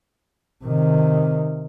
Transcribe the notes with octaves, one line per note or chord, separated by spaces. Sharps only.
C3 D#3